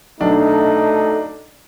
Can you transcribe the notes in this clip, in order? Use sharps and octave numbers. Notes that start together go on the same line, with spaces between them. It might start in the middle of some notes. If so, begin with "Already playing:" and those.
B1 A3 D4 D#4